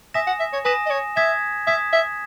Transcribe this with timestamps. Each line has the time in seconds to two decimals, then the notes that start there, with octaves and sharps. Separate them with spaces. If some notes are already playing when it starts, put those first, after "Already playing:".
0.14 E5 G#5 D#6 A#6 E7
0.27 F#5
0.40 E5
0.53 C#5
0.65 B4 G#5 D#6 A#6 E7
0.86 D#5
0.90 C#5
1.16 E5 D#6 G#6 B6 E7
1.67 E5 D#6 G#6 B6 E7
1.93 E5